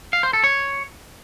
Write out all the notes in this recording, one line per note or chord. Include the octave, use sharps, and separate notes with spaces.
F5
C5
A4
C#5